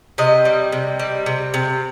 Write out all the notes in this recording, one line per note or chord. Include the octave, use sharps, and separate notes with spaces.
C3 D#5
G3
C3
G3
C3
C3